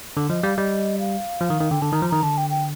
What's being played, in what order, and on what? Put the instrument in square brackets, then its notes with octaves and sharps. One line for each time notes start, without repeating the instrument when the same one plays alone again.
[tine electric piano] D3
[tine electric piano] F3 [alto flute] D#5
[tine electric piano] G3 [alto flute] F5
[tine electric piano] G3 [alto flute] D#5
[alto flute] F5
[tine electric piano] F3
D#3
D#3
[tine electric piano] D3 [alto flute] G5
[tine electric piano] D3 [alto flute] A5
[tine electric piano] D#3
[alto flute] A#5
[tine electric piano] F3
[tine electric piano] D#3 [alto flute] A#5
[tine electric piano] D3 [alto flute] A5
[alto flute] G5
G5